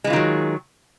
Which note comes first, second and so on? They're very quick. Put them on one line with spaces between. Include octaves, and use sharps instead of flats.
G#3 E3 F4 D#3 F#3